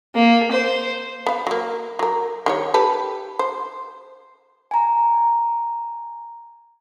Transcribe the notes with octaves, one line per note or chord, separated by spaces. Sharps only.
A#3
C5
B3 F5
F#3 A#3
F#3 A#4
D#3 G3 C#5
G4 A4 B4
C5
G#5 A#5